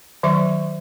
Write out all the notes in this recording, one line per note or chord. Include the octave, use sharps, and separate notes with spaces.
D#3 F#3 E5 C#6